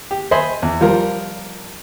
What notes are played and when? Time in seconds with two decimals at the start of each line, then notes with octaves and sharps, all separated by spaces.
0.11 G4
0.31 C5 D#5 E5 G#5 B5 C6
0.62 E2
0.81 F3 G3 F4 A#4